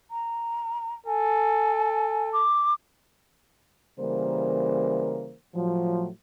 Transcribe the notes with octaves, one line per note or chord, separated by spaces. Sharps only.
A#5
A4 G#5
D6
C#3 E3 G3 A#3 A#4 C5
A2 F3 F#3